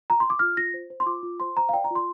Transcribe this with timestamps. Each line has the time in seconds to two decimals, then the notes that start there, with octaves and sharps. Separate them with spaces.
0.10 A#5
0.20 C6
0.30 D6
0.39 F4 F6
0.57 F4 A#6
0.74 C5
0.90 C5
1.00 C6
1.06 F4 D6
1.23 F4
1.40 C5 C6
1.57 C5 A#5
1.69 F5
1.73 D5 G5
1.84 A#5
1.91 F4 C6